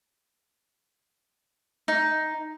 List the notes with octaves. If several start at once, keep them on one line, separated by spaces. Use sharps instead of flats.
D#4